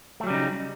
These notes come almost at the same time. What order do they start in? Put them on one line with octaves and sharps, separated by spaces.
A3 F#3 G3 C#3 D#4